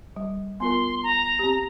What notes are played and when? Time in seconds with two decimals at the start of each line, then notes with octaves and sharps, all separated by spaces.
0.16 G3
0.60 B3 F4 A#4 C6
1.03 A#5
1.39 C4 G4